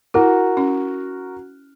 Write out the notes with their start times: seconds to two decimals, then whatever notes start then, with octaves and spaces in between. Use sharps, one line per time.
0.14 E4 F#4 A#4
0.57 C#4